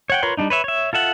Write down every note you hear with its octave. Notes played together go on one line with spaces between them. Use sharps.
C#5 F#5 G5
F4 A#4 B4 C#5 C6
G3 C4 D4 D#4
B4 C#5 E5
C#5 E5
F4 A4 E5 F#5